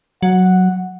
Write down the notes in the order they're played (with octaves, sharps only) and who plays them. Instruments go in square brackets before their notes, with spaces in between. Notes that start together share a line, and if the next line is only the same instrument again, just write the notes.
[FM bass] F#3 [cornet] F#5